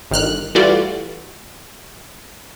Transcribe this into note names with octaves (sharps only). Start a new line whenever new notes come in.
G1 D#3 F6 F#6
E3 G3 A3 F4 F#4 D5